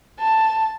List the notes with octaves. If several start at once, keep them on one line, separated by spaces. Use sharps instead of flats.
A5